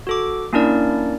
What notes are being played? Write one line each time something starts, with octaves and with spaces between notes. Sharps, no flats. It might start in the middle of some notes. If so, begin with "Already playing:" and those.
F#4 A4 D6
A#3 C#4 D4 E4 A#4 D5